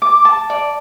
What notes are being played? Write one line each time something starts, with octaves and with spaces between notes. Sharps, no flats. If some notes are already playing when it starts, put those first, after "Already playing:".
D6
A5
D5